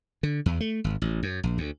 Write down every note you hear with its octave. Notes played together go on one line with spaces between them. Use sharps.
D3
E2
A3
G#1
A1
F#2
A#1
D2